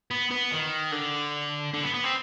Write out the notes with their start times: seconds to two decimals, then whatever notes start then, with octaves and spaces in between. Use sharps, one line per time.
0.11 B3
0.31 B3
0.51 D#3
0.92 D3
1.73 D3
1.83 B3
1.94 B3
2.04 C4